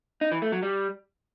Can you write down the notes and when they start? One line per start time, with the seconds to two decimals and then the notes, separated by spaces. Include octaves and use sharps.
0.21 D#4
0.32 E3
0.42 A3
0.52 F#3
0.63 G3